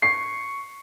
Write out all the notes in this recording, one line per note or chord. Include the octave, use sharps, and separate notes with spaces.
C#6 C7